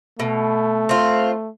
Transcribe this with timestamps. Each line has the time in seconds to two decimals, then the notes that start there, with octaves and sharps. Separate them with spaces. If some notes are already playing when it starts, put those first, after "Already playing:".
0.20 B2 A3
0.89 C4 F4